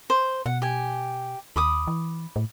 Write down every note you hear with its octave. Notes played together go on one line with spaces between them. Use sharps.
C5
B2 F#5
G4 G#5
D#2 B5 D6 D#6
E3
A2